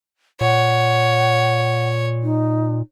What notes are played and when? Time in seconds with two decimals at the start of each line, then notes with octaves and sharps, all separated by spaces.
0.41 A#2 C#5 F#5
2.23 D#4